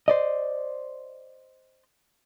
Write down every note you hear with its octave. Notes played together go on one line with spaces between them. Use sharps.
C5 D5 D#5